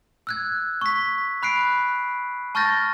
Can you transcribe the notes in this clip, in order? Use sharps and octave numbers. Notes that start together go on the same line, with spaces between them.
E6 F#6 G#6
C#6 B6
B5 F#6 C7 D7
A5 C#6 F6 G6 A6 A#6